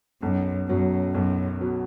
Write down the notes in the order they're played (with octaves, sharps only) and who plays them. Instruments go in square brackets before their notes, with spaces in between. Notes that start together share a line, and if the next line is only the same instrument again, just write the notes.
[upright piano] B1 [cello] F#2
[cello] F#2 [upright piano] B2 F#3
[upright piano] B1 [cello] F#2
[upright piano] B2 F#3